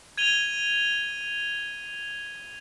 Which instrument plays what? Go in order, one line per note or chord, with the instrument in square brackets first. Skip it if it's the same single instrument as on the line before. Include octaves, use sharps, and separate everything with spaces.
[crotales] G#6 D#7 F7 G7